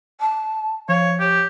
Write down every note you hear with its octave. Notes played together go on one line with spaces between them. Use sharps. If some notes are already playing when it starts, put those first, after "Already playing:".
A5
F3 C#5 F5
G4 C#5